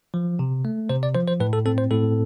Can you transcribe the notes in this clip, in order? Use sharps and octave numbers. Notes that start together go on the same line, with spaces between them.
F3
C3
A3
C3 C5
D5
F3 C5
C5
A2 B4
A4
C4 A4
C5
A2 A4